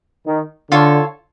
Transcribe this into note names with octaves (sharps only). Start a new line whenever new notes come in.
D#3
D3 F4 A4 C#5